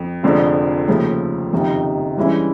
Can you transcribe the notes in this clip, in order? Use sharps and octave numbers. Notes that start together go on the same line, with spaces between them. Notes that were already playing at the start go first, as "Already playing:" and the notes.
Already playing: F2
F1 F2 D3 F3 G#3
D#2 C#3 F3 A3
F#1 F2 C3 D#3
G2 E3 G#3 C#4 E4